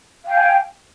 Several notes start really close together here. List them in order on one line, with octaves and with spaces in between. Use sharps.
F5 G5 G#5